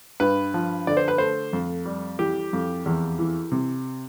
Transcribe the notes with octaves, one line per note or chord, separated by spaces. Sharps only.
G2 B4
F3
D3 D5
C5
B4
A3 C5
F2
G3
E3 G4
F2
E2
E3
C3